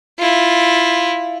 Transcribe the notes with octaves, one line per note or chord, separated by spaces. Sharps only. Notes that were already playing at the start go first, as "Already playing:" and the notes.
E4 F4